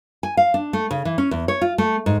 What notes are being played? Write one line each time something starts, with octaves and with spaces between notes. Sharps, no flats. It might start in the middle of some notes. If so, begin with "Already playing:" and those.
G#5
F5
D4
A3
C#3
E3
C#4
E2
C#5
F4
A3
G#2